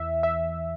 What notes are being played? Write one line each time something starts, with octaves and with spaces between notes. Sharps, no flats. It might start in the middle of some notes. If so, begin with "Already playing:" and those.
Already playing: E2 E3 E5
E5